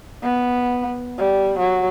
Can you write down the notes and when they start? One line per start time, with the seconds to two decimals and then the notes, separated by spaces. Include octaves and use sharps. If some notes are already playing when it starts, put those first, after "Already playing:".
0.23 B3
1.18 G3
1.59 F#3